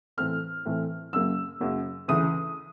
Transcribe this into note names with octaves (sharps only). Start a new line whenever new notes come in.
A2 E3 A3 C4 F6
A2 E3 A3 C4
F#2 C#3 F#3 A#3 E6
F#2 C#3 F#3 A#3
D2 C#3 E3 D#6